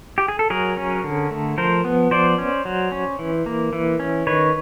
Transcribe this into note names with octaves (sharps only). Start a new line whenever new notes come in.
G4
G#4
A4
F#3 G#4 A#4
C#4
D3
A3
F3 A#4 C5
B3
F3 C5 D5
C#4
F#3
C#4
E3
A#3
E3
C#4
D#3 B4 C#5